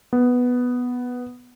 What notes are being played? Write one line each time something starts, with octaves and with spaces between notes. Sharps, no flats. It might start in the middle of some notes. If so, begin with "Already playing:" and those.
B3